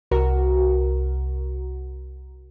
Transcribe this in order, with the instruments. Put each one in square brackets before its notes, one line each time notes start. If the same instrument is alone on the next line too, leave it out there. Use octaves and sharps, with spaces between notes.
[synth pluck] C2 F#4 A#4